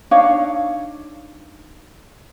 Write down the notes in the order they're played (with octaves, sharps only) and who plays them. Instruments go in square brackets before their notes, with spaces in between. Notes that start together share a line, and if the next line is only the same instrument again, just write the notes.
[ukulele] D4 D#4 C#5 F5